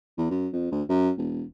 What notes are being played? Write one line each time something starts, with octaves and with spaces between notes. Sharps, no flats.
E2
F#2
F2
D2
F#2
E1